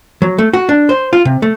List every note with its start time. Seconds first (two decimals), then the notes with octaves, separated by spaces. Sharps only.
0.22 F#3
0.38 A3
0.53 F#4
0.69 D4
0.89 C5
1.13 F4
1.25 C3
1.42 A3